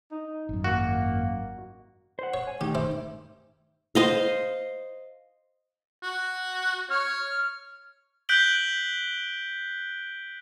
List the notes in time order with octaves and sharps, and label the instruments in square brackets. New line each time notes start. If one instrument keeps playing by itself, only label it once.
[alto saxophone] D#4
[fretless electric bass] G#1 F#2
[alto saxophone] A#3 [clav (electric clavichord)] F#4
[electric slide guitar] C5 F#5
[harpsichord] C#5
[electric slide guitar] G#5
[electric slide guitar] D#3 A3 D#4 [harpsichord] G4
[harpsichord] E4 C5 D6
[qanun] C5 D#5 F5
[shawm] F#4
[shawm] C#5 [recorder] F6
[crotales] F#6 G6 B6 D7 F#7 G7